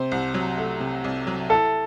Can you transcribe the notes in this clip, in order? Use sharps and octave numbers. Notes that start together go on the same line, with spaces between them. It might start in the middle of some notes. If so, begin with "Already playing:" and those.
Already playing: C3 C5
C2
F#3
A3
C3
C2
F#3
E4 A4